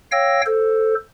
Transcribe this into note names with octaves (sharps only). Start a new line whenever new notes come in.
C#5 F5 G5 E6 A#6
A4 C5